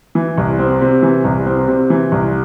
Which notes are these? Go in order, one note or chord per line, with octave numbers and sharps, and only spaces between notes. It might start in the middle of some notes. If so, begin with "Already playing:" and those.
E3
C2
C4
C3
E3
C2
C4
C3
E3
C2